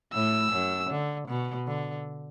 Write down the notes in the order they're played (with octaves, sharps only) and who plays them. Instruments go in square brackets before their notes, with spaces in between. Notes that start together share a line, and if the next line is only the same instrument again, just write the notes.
[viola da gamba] A2 [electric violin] E6
[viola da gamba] F#2
D3
B2
D3